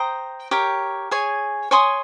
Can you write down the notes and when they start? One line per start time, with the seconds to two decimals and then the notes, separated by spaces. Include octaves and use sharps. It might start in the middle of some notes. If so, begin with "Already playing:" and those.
Already playing: C5 G5 A#5 D#6
0.51 G4 A#4 C#5 G5
1.11 G#4 C#5 G#5
1.71 C#5 G#5 C6 D#6